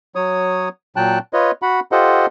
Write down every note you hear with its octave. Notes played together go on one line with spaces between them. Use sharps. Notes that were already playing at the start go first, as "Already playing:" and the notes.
F#3 C#5 D#6
A#2 F#3 G5 A5 F#6
F4 B4 C#5 D#5
F#4 F#5 B5
F4 G4 A4 C5 D#5 F#5